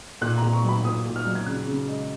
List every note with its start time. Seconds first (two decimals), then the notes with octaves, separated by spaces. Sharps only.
0.21 A#2 F#6
0.38 A#2 A#5
0.53 C#6
0.63 F#3
0.69 B5
0.84 A#2 D#6
1.06 A#2
1.16 F6
1.25 F#3
1.35 G#6
1.46 C#3 F#6
1.67 C#3
1.88 G#3